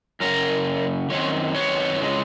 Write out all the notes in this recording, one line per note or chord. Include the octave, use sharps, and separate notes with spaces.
F#2 C#3 A#4
F#2 D#3 C4 C#5
B4 C#5
C#3 E3 G#3